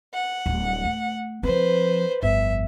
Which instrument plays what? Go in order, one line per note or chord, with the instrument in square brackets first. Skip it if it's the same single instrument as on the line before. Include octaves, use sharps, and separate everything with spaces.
[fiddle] F#5
[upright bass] D1 G3
A3
[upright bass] F3 C4 [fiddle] B4 C5
[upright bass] G1 F2 [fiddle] E5